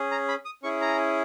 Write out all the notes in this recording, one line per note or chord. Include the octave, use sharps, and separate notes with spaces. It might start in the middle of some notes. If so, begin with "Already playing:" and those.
Already playing: C#4 G#4
A#5
B5
D#6
C#4 E4 G#4 C#6
A#5